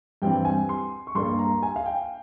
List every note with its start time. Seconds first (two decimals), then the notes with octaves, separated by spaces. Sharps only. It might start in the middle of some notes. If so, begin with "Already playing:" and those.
0.22 G2 E3 G3 C4 G5
0.45 G#5
0.69 C6
1.07 C#6
1.15 G2 G3 A#3 C6
1.39 A#5
1.63 G#5
1.76 F5
1.86 G5